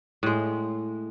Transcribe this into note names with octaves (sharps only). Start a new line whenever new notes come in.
A2 G#3